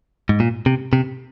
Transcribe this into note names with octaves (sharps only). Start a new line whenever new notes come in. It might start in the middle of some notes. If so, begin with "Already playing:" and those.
G#2
A#2
C3
C3